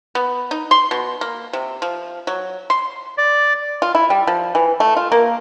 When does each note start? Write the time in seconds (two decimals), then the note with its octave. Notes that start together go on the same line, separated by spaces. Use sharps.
0.15 B3
0.51 D#4
0.71 C6
0.91 B2
1.21 A#3
1.53 C3
1.82 F3
2.27 F#3
2.70 C6
3.18 D5
3.82 F4
3.95 E4
4.10 G3
4.27 F3
4.55 E3
4.80 A3
4.97 F4
5.12 A#3